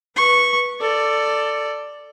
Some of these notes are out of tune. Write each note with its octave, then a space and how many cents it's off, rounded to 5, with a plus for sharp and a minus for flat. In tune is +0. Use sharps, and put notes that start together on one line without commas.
B4 -15 C#6 -10
A4 +15 D5 +0